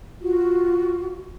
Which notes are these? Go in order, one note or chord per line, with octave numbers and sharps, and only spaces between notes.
F4 F#4